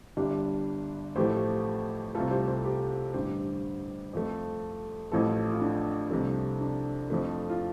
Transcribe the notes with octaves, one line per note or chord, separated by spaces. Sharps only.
G1 G2 G3 D4 G4
A1 A2 F3 A3 G4 C5
C2 C3 A3 F4 A4
G4 C5
G4 C5
G4 C5
A1 G2 D3 G4 C5
F2 F3 A3
A1 A2 F3 A3 F4 A4
F4
D4
C2 C3 F3 A3
D4
F2 F3 A3
F4